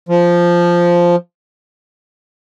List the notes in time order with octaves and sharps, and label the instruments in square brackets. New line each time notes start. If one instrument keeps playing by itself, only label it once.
[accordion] F3